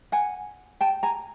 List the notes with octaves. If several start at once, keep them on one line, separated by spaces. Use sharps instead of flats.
F#5 G#5
G5 A5
G#5 A#5